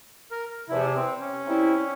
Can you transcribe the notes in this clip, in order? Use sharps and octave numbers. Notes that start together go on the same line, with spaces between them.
A#4
E2 C3 F3 E4
C4
C#4
C3 G3 C4 E4